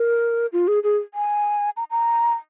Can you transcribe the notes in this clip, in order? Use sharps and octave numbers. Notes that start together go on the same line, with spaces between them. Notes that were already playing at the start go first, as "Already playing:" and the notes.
Already playing: A#4
F4
G#4
G#4
G#5
A#5
A#5